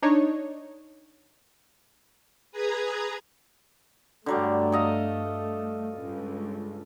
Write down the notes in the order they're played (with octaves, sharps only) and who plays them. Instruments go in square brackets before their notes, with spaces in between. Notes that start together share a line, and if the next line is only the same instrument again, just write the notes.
[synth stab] D4 D#4 C#5
[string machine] G#4 B4 A#5 D#6 G#6
[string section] G2 A3 [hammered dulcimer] D3 F#3 G3
[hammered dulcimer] A4 D#5 F5
[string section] C#2 G2